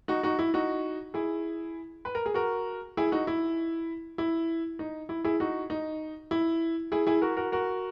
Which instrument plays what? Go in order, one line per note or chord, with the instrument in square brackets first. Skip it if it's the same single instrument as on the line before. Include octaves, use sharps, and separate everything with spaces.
[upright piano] D#4 F#4
D#4 F#4
E4
D#4 F#4
E4 G#4
B4
A#4
G#4
F#4 A#4
E4 G#4
D#4 F#4
E4
E4
D#4
E4
E4 G#4
D#4 F#4
D#4
E4
E4 G#4
E4 G#4
F#4 A#4
F#4 A#4
F#4 A#4